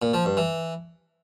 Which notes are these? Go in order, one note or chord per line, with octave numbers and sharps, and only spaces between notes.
A#2
F3
G2
E3